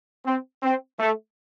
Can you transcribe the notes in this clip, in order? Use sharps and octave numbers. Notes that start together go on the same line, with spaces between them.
C4
C4
A3